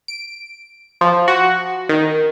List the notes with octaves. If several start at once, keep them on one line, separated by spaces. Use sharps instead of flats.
D7
F3
F#4
D#3